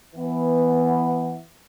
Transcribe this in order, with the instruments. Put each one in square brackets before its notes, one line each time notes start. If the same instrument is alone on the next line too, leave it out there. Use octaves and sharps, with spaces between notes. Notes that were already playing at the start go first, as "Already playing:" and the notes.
[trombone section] E3 B3